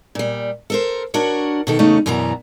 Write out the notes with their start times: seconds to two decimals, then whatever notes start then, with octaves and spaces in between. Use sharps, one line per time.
0.15 A#2 G3
0.70 A4 A#4 C5
1.14 D4 F#4 A#4 C#5
1.67 B2 D#3 A4
1.79 E2 C#3 A3 C#4 D#4
2.06 F#2 B2 E3 G3 A#5